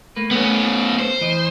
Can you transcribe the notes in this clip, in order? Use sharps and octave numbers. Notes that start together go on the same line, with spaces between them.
A3 A#3 B4
A3 B3 C#4
C5
E3 D#5